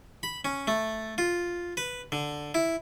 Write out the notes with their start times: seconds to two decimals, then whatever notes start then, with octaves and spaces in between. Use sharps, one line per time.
0.23 B5
0.45 C#4
0.67 A3
1.18 F4
1.77 B4
2.12 D3
2.55 E4